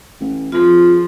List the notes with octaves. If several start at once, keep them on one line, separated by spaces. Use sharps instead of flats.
A1
F2 F3 F4 G#4